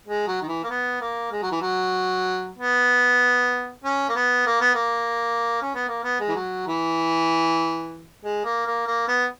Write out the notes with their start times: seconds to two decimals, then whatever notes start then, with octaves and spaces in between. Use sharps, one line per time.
0.07 G#3
0.27 F#3
0.42 D#3
0.48 E3
0.64 A#3
0.70 B3
1.01 A#3
1.32 G#3
1.42 F#3
1.52 E3
1.61 F#3
2.58 B3
3.84 C#4
4.08 A#3
4.15 B3
4.46 A#3
4.61 B3
4.74 A#3
5.62 C#4
5.75 B3
5.88 A#3
6.04 B3
6.20 G#3
6.29 E3
6.35 F#3
6.67 E3
8.24 G#3
8.44 A#3
8.66 A#3
8.87 A#3
9.08 B3